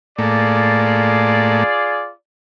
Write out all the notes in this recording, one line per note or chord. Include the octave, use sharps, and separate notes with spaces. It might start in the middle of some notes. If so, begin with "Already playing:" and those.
A2 A3 A#3 F4 G#4 D5